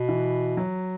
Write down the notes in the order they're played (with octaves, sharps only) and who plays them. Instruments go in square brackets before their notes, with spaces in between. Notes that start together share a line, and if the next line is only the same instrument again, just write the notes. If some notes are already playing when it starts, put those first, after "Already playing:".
Already playing: [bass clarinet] B2
[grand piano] E3
F#3